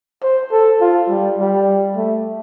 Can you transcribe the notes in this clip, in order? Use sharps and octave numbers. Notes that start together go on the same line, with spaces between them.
C5
A4
F4
G3
G3
A3